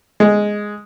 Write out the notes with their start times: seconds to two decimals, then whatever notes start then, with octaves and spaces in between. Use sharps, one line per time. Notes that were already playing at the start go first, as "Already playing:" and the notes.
0.20 G#3